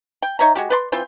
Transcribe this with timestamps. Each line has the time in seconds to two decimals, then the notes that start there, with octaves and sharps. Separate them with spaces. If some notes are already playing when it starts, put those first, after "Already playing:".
0.22 G5
0.39 D#4 C#5 E5 A#5
0.55 G#3 F#4 G4
0.70 B4 D5 C6
0.92 E3 C4 F4 G5